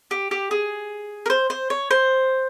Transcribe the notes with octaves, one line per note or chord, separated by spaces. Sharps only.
G4
G4
G#4
A#4
C5
C5
C#5
C5